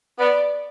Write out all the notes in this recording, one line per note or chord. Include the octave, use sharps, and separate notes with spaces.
B3 D5